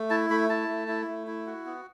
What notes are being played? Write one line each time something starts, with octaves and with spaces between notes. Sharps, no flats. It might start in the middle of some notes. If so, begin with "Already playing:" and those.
Already playing: A3
E4 A5
A3 B5
E4 A5
A3
E4
A3
E4
F#4
B3